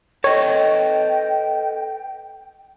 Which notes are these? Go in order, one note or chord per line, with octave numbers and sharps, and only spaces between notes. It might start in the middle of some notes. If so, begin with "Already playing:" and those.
A4 B4 C#5 D#5 G5